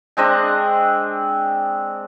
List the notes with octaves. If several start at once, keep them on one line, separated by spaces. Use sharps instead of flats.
G#3 C4 D4 D#5